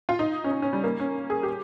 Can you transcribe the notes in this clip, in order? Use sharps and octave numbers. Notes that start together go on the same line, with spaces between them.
F4
D#4
C#4
D#4
C#4
G3
A#3
C#4
G#4
G4